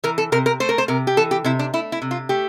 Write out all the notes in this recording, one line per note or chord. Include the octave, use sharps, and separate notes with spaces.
E3 A#4
A4
C3 A#4
A#4
A3 C5
A#4
C5
C3 A#4
G4
E3 A4
G4
C3 E4
D4
A3 E4
E4
C3
F4
A3 G4